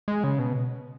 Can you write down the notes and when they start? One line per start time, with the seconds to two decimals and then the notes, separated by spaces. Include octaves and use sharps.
0.08 G#3
0.24 C#3
0.39 B2